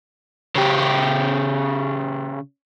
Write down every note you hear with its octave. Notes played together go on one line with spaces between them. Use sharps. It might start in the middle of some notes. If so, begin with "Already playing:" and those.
C#3 G4